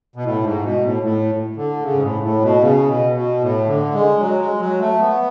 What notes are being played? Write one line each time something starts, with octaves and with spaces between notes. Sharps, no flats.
B2
A2
G#2
B2
A2
A2
D3
C#3
G#2
A2
A2
B2
C#3
B2
B2
A2
D3
G#3
F#3
G#3
F#3
A3
B3